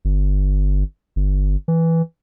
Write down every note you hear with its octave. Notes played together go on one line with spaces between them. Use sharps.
G1
G1
E3